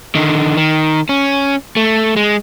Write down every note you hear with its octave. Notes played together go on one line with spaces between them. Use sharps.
D3 D#3
D#3
C#4
A3
G#3